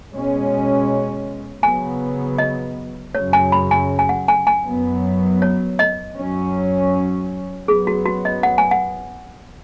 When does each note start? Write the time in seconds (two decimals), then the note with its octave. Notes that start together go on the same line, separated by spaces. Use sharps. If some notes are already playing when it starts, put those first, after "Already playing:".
0.12 B2 G#3 C#4
1.63 C#3 F#3 B3 G#5
2.38 D#5
3.14 F#2 C#3 F#3 C#4 C#5
3.33 G#5
3.52 B5
3.71 G#5
3.99 G#5
4.09 F#5
4.28 G#5
4.47 G#5
4.66 F#2 F#3 B3
5.42 C#5
5.79 D#5
6.17 F#2 F#3 C#4
7.68 F#2 F#3 B3 G#4
7.87 F#4
8.05 F#4
8.25 D#5
8.43 F#5
8.58 G#5
8.71 F#5